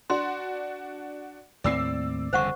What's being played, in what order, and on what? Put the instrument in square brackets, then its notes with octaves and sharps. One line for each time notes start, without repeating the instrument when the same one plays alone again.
[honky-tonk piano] D4 F#4 [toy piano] C6
[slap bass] D#2 A2 C4 [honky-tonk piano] D5 E6 C7
[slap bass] G1 F2 C#3 [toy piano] C5 F#5 C#6